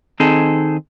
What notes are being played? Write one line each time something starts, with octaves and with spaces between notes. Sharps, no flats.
D#3 C4 D#4 G#4 A4